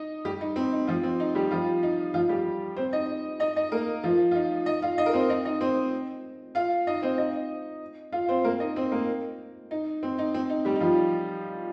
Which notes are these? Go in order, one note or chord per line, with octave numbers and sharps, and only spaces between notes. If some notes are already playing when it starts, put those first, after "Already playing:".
Already playing: D#4 D#5
G3 G4
D#4
C4
D#4
F3 F4
C4
D#4
G3 G4
F3 F4
D#4
F3 F4
G3 G4
C4 C5
D#4 D#5
D#4 D#5
D#4 D#5
A#3 A#4
F3 F4
F4
D#4
D#4 D#5
F4 F5
D#4 D#5
A#4
C4 C5
D#4 D#5
D#4 D#5
C4 C5
F4 F5
D#4 D#5
C4 C5
D#4 D#5
F4 F5
C4 C5
A#3 A#4
D#4 D#5
C4 C5
A#3 A#4
D#4
C4
D#4
C4
D#4
G3 G4
D#4
F3 F4